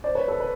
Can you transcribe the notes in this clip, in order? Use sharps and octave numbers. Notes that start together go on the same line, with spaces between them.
C5 D5
B4 C#5
A4 B4
B4